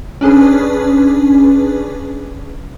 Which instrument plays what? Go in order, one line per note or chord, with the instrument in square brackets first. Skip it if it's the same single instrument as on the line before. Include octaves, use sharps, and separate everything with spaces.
[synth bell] C#4 D4 G#4 B4